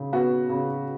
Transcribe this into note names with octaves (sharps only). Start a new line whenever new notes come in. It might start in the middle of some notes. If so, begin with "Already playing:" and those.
Already playing: C#3
B3 F#4
C#3